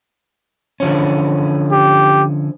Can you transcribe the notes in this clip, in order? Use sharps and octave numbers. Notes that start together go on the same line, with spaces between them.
D3 F3 C#4
G4